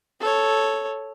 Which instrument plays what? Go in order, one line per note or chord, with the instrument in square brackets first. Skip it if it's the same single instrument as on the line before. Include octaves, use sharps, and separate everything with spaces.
[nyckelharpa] A4 C#5